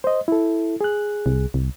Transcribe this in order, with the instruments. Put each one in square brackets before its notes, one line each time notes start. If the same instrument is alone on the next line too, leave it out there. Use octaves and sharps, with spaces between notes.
[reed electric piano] C5 D#5
E4 A4
G#4 F#6
[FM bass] C2
C2